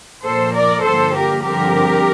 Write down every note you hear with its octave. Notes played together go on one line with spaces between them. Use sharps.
A#2 F3 A#3 A4 C5
A#4 D5
G2 D3 F3 A#3 A4 C5
G4 A#4
G2 D3 F3 C4 G4 A#4